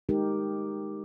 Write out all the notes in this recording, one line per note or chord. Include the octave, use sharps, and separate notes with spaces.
G#3 D#4 G4 A#4